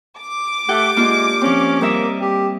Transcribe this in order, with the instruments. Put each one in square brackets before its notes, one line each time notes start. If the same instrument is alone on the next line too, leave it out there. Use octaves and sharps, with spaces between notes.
[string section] D6
[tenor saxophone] A3 [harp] G4 F#5 G5
[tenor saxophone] G#3 [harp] A#3 D4 F4
[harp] F3 C4 [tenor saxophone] C#4
[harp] G3 D#5 E5 [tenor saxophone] A#3
[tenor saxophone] G4